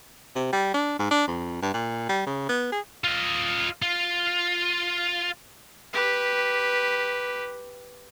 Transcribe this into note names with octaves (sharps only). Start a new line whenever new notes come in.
C3
G3
D4
G#2
D4
F2
G2
A#2
G3
C#3
B3
G#4
F4 D#5
F4
G4 B4